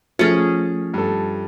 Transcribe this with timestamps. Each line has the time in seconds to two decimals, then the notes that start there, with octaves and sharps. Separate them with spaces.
0.19 F3 A3 C#4 G#4 F6 A6 C#7
0.94 G2 A4